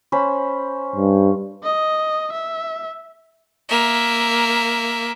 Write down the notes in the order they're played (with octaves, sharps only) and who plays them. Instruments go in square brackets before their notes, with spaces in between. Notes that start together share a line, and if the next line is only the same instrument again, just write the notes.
[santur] C#4 C5 B5
[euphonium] G2
[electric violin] D#5
E5
[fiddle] A#3 E5